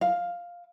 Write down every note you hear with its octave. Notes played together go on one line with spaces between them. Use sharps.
F5